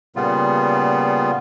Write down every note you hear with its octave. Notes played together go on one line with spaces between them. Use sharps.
A#2 C#3 G3 B3 F4